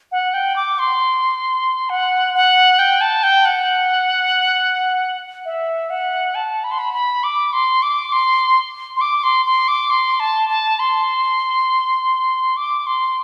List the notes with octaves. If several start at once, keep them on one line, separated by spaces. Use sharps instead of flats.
F#5
G5
D6
C6
F#5
F#5
G5
A5
G5
F#5
E5
F#5
A5
B5
C6
B5
B5
D6
C6
D6
C6
C6
D6
C6
C6
D6
C6
A5
A5
C6
D6
C6